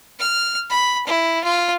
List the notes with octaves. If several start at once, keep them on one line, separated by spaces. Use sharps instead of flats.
F6
B5
E4
F4